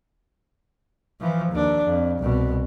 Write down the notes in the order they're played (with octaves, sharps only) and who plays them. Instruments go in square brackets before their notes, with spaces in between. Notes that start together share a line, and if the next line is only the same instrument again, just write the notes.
[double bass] E3 F3
D#2 D4
F2
C2 B2